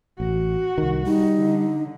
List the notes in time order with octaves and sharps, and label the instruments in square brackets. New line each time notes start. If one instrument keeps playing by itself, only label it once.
[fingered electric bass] A1 [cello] F#4
[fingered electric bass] C2 D#3
[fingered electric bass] G3 [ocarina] D#4
[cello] D3